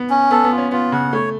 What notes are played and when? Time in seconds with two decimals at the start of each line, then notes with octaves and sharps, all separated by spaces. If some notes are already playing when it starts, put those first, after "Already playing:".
Already playing: B3
0.10 C#4
0.31 B3 A4
0.44 B3
0.52 F4
0.58 C#4
0.72 B3 F4
0.92 C#3 F#5
1.13 A3 C#5